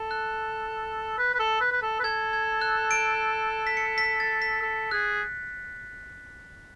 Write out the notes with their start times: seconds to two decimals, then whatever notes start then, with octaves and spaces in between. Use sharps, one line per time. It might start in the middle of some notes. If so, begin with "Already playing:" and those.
Already playing: A4
0.11 F#6
1.18 B4
1.35 B4
1.39 A4
1.61 B4
1.72 B4
1.82 A4
2.00 B4
2.04 A4 G#6
2.33 G#6
2.61 F#6
2.91 D7
3.67 B6
3.77 C#7
3.98 B6
4.20 A6
4.42 B6
4.62 A4
4.91 G#4 F#6